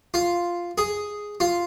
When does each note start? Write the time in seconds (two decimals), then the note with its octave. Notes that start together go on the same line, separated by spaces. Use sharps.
0.14 F4
0.78 G#4
1.40 F4